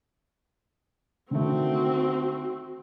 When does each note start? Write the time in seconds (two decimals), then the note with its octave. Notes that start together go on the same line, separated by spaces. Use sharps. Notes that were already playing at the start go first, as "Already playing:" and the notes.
1.31 D3 D#3 A3 C4 F#4